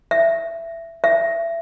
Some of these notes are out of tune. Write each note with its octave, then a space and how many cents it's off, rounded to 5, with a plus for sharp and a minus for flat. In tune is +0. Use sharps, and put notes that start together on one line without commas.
E5 +15
E5 +25